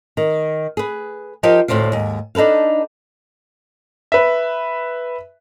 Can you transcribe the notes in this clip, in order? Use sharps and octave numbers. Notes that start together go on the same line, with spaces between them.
D#3
G#4 B4
F3 D#4 G4 A#4 C5 F5
D2 A2 C5 D5 F5
D#2 G#2
D4 D#4 A4 B4 F5
B4 E5